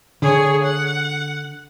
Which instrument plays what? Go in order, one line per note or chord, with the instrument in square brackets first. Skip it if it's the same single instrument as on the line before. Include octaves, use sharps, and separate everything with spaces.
[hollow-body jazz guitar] D3 [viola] G#4 C#5
[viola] F#5